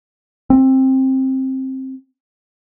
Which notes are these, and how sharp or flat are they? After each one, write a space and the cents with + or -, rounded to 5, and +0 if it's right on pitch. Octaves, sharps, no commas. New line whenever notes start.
C4 +15